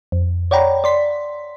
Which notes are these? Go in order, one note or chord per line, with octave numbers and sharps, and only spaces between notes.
F2
C#5 D5 F#5 G5 A#5 B5
D5 C6 B6